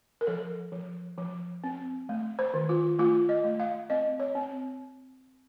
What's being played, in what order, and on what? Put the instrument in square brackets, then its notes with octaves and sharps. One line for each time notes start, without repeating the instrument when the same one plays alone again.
[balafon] A#4
F3 A4
F3
F3
C4
A3
C5
D#3
F4
A3 F4
D#5
A3
F5
C4 D#5
C#5
C4